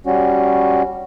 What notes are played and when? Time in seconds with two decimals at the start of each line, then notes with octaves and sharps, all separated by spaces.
0.06 G3 C#4 F#4